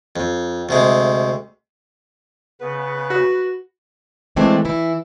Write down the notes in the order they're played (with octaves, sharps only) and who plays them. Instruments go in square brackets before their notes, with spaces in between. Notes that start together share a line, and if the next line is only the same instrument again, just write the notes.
[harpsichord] F2
D2 C3 G#3
[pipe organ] C#3 B3 [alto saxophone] B4
[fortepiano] F#4
[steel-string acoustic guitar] E3 G#3 A3 C4 D4
E3 E4